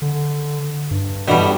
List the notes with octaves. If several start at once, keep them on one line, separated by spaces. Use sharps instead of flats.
D3
G2
B2 D3 E3 G3 B3